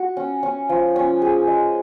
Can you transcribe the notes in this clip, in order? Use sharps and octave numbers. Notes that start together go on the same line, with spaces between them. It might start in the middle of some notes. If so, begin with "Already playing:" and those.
Already playing: F#4
C#4
C#4
F3
C#4
G#4
G#3